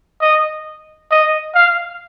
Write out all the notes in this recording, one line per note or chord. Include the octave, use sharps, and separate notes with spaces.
D#5
D#5
F5